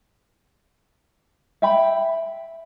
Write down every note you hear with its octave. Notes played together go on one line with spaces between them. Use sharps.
E5 G5 B5